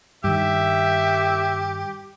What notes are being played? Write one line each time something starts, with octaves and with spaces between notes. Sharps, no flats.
G2 D#3 G4 E5